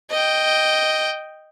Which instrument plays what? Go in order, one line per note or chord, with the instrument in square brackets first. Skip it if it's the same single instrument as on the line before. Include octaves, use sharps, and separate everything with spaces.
[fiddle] D#5 G5